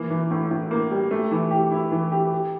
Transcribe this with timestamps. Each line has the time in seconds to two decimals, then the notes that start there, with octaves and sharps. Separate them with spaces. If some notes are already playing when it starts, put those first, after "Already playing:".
Already playing: E3 A#3
0.10 E3
0.31 A2
0.51 A2
0.71 A#3
0.91 G3
1.11 A3
1.31 E3
1.51 G4
1.72 E4
1.92 E3
2.12 G4
2.32 G4